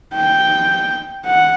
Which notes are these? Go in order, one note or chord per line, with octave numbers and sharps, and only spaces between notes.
G5
F#5